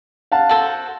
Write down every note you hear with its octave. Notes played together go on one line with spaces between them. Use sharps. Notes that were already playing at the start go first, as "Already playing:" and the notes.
F5 F#5 A5
F#4 A4 C5 F#5